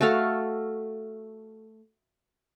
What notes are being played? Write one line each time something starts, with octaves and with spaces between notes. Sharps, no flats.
A3 F#4 A4 F5